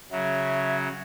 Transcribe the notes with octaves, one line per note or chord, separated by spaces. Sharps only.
C#3 F#3 E5